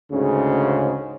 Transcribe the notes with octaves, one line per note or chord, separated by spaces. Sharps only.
D2 G#2 C#3